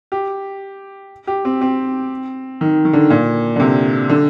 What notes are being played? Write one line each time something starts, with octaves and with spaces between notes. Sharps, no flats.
G4
G4
C4
C4
D#3
D#3
D3
A#2
D3
C3
D3